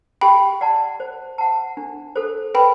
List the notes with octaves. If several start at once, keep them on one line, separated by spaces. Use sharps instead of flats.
G4 G5 B5
D5 F#5 A5
C5
F#5 A5
D4
A4 C5
B4 G5 B5